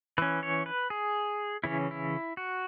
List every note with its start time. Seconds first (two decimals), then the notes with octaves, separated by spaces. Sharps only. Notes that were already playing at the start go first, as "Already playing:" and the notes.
0.18 E3 C#4 B4
0.43 C#5
0.66 B4
0.90 G#4
1.64 C#3 E3 C#4 E4
1.91 E4
2.37 F#4